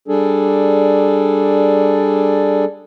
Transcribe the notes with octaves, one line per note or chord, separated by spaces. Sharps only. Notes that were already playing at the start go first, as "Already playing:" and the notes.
G3 D4 G#4 A4